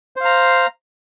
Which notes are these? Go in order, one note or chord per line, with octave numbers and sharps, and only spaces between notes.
C5 F5 A#5